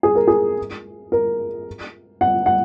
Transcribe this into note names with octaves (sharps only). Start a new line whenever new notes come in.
G#4
A#4
G#4
A#4
F#5
F#5